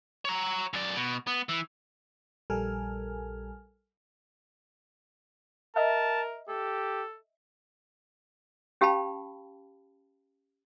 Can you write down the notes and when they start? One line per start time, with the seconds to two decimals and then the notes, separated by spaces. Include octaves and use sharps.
0.25 C#5 A#5
0.73 F#2 D5
0.96 B2
1.27 B3
1.49 E3
2.50 A#1 G3 A4 A#4 G#5 F6
5.76 A#4 D#5 E5 A5
6.49 G4 A4
8.81 C#4 G4 F5 G5 A5 B5